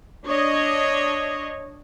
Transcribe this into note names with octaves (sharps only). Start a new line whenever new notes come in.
D4 C#5 D#5